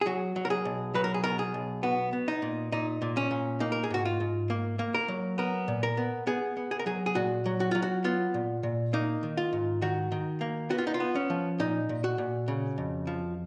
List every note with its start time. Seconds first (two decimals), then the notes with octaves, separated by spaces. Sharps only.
0.01 G#4
0.06 F#3 F#4
0.36 F#3
0.45 A#4
0.50 G#4
0.65 B1
0.94 F#3 B4
1.04 A#4
1.14 G#4
1.24 B2 A#4
1.39 G#4
1.54 B1
1.83 B3 F#4
2.13 B3
2.28 D#4
2.42 A#2
2.72 A#2 D#4
3.02 A#2
3.17 C#4
3.31 A#2
3.60 A#3 D#4
3.72 A#4
3.84 G#4
3.90 G#2 F#4
4.05 F4
4.20 G#2
4.50 A#3
4.79 A#3
4.94 A#4
5.08 F#3
5.38 B3 A#4
5.68 A#2
5.83 A#4
5.97 B3
6.27 B3 G#4
6.57 B3
6.71 G#4
6.79 A#4
6.86 F#3 G#4
7.06 G#4
7.15 A#2 F#4
7.46 F#3
7.60 F#4
7.71 F#3 F4
7.82 F#4
8.04 B3 F4
8.34 A#2
8.63 A#2
8.93 A#3 D#4
9.23 D#3
9.37 F4
9.53 G#2
9.82 D#3 F#4
10.12 D#3
10.41 A#3
10.70 B3 F#4
10.78 F4
10.87 D#4
10.94 F4
11.00 B3
11.15 C#4
11.30 F3
11.59 A#2 D#4
11.89 A#2
12.04 F#4
12.18 A#2
12.48 C#3
12.78 F2
13.07 F3